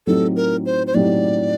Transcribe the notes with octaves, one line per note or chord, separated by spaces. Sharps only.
A2 F#3 C4 D#4 G4 A4
A#4
C5
C5
A2 F#3 C4 D#4 G4 D5